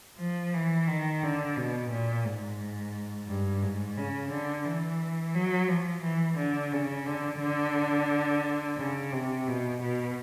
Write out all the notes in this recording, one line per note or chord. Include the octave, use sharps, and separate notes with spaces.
F3
E3
D#3
D3
B2
A#2
G#2
G2
G#2
C#3
D3
E3
F#3
F3
E3
D3
C#3
D3
D3
C#3
C3
B2
B2